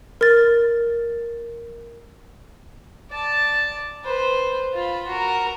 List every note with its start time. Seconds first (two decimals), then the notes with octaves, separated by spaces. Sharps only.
0.21 A#4 A6
3.11 D5 A5
4.04 B4 C5
4.74 F4 B5
5.07 F#4 A#4